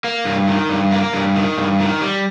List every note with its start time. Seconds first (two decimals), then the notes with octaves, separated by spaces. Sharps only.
0.04 A#3
0.25 G2
0.48 D#3
0.70 G2
0.92 A#3
1.14 G2
1.36 D#3
1.58 G2
1.80 D#3
2.02 G3